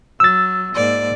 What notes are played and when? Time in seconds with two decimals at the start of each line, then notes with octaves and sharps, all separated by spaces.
0.20 F#3 E6 A6
0.75 G#2 A#3 D5